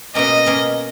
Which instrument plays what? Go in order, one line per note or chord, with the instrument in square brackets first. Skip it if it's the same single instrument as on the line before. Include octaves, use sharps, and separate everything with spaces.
[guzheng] B2 A#3 C#4 [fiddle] D#5
[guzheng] B2 A#3 C#4